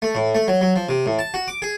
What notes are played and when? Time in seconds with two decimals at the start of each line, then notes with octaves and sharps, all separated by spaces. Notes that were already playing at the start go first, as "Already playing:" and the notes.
0.02 A3
0.15 A2
0.35 A3
0.48 F#3
0.61 F#3
0.76 F3
0.89 C3
1.06 A2
1.19 A5
1.34 F#4
1.48 D6
1.62 G#4